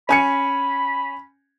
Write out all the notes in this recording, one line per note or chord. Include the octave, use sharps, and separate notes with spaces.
C#4 G#5 B5 C#7